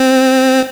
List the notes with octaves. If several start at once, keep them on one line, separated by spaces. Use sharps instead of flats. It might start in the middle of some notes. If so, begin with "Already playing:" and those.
Already playing: C4